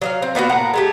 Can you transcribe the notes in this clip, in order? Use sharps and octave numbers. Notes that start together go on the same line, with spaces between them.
F#3 D5 F5
C4
A#3 B3 D#4 F#4
A2 A#3 F#5 A#5
G#3 A3 G4